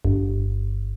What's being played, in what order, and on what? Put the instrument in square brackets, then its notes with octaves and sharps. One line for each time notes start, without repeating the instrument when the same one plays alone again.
[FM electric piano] G1